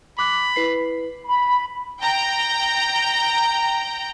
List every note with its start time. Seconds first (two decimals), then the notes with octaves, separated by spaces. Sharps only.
0.19 B5 D6 F#6
0.56 E4 B4 C7
1.25 B5
2.00 G5 A#5